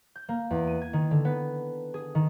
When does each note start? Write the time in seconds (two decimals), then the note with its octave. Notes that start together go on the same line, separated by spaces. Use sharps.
0.16 G6
0.29 A#3
0.50 E2
0.67 D#7
0.82 G#6
0.93 D#3
1.11 D3
1.25 B3
1.94 G#4
2.15 D#3